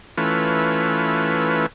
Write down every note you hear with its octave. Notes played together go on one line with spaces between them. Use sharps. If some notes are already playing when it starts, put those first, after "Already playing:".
E3 A3 C#4 F4 B4